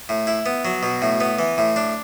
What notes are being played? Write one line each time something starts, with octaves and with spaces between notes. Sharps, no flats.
A2
E4
B3
F#3
B2
A2
B3
E3
A2
D4